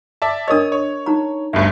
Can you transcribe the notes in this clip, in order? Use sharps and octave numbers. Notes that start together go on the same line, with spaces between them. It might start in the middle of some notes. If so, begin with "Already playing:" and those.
D5 E5 A5
D4 A#4 C#5 D#5 D#6
C#5
D#4 A#5
G1 D2 G2 E5